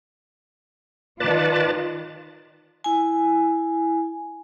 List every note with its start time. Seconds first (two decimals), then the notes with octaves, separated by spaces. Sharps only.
1.20 D#3 F4 B4 D5 A5
2.84 E4 G#5